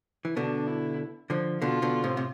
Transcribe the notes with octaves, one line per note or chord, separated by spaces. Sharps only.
E3
B2 D3 D4
E4
D3 F3
B2 D3 F4
B2 D3
A2 C3
C3